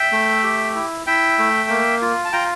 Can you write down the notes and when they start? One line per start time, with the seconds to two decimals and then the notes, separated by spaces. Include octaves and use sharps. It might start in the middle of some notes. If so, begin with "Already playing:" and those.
Already playing: E5 G5
0.12 A3
0.44 G4
0.75 E4
1.07 E4 E5 G5
1.38 A3
1.69 A#3
2.02 F4
2.25 A5
2.33 F4 G5 A#5